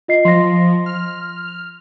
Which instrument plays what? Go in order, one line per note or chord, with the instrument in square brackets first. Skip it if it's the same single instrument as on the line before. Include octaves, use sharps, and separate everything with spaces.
[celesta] F4 D#5 C7
[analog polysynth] F3 [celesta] C6 A#6
[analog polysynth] F6